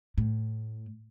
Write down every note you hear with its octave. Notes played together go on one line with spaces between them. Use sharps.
A2